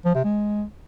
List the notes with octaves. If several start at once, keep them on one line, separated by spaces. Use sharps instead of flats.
F3
C3
G#3